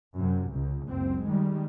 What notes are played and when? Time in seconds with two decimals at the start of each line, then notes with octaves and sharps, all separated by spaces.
0.16 F#2 C3
0.51 C#2
0.85 F#1 C#2 C4
1.27 D#3 G3 G#3